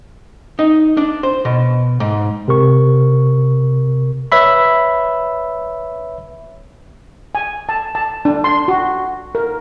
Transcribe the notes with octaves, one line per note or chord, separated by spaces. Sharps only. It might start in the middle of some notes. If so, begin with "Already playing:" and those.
D#4
D4
C5
B2
G#2
C3 A#4 C#6
B4 C#5 E5 B5
G#5
A5
A5
D4
C6
F#4
A#4